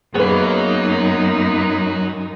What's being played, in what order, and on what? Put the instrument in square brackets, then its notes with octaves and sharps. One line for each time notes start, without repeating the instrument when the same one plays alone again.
[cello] F#2 D#4 [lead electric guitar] F#3 C#5 [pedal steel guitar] A#3 B3 [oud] G#4 B4